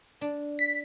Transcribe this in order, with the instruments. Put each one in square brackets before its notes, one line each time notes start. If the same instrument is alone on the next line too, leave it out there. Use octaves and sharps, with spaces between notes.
[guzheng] D4
[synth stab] B6